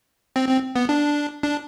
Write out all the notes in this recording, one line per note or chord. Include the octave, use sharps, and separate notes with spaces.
C4
C4
B3
D4
D4